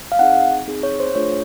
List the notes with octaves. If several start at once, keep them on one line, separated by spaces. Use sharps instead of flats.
F5
C4 D#4 G#4 F#5
C4 D#4 G#4
C#5
C5
A3 D4 F4 G#4 C#5